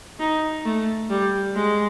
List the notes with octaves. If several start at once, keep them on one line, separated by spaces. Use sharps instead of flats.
D#4
A3
G3
G#3